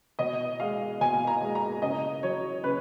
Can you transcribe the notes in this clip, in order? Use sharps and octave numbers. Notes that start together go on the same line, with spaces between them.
B2 D#5
G#3 F5
B2 G#5
A#5
G#3
A#5
C#3 D#5
F#3 C#5
C#3 B4